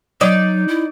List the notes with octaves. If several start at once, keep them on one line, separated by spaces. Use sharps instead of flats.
F#3 D#4 D5
E4